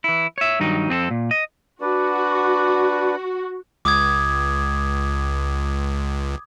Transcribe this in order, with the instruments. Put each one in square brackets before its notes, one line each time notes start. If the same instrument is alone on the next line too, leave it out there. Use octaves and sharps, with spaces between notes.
[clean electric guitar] E3 E4
C#5 E5
G2 D#3 F#3 D#4
F2 C4 G#4 A4
A#2
D#5
[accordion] D4 B4 D5 [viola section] F#4
[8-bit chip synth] C#2 [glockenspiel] D6 D#6 G#6